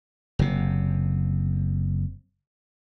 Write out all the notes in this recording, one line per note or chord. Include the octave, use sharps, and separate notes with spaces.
F#1 C3